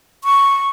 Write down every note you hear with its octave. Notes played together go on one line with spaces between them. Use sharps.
C#6